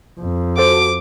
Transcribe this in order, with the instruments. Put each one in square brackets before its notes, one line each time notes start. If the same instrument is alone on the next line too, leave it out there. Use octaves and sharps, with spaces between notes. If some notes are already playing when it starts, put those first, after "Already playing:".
[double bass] F2
[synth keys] F#4 A4 C5 [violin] D6